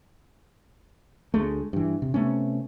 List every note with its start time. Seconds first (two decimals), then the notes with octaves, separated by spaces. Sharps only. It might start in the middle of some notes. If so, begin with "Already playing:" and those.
1.34 D2 G#3 A3
1.73 G2 E3
2.02 C3
2.14 C3 A3 B3 C#4